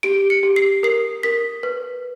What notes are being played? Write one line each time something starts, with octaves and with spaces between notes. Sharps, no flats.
G4 D7
C#7
G4
C7
A#4 C7
A#4 B6
B4